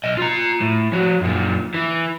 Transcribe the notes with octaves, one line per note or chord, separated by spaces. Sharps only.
B1 D#5
F4 A#5
A2
F3 F#4
F#2 A#2
E3